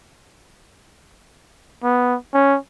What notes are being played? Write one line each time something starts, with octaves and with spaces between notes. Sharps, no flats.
B3
C#4